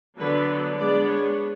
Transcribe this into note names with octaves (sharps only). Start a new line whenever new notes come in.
D3 F#3 B3 D4 B4
G#3 B3 D4 D5
C#5